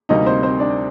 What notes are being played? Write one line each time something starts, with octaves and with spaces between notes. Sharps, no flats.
D2 C3 G3 A#3 D#4 D#5
C4 C5
C4 C5
D4 D5